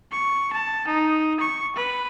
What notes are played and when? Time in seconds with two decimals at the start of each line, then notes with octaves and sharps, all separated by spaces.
0.12 C#6
0.53 A5
0.88 D#4
1.40 C#6
1.76 B4